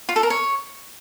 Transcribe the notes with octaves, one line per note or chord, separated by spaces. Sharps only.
F4
A4
A#4
C#5